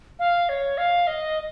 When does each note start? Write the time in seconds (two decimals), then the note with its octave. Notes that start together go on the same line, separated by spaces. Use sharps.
0.19 F5
0.49 C#5
0.78 F5
1.07 D#5